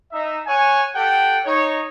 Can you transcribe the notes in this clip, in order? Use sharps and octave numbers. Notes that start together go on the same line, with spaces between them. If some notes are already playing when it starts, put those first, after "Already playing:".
D#4 E5
C#5 F#5 G#5
G4 A4 F#5 G5
D#4 C#5